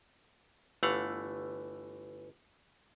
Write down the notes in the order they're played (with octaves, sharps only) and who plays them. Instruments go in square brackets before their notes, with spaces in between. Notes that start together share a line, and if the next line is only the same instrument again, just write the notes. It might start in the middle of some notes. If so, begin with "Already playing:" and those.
[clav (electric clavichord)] G1 E3 A3 F5 F#5